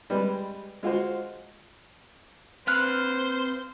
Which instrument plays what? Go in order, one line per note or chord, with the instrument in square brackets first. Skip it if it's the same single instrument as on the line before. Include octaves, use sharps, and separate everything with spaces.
[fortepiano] G3 G#3 B4
G#3 F4 F#4 C5
[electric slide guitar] C4 B4 [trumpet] C5 [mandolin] F5 F#6